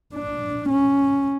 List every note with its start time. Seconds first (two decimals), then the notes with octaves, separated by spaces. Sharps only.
0.15 D4
0.70 C#4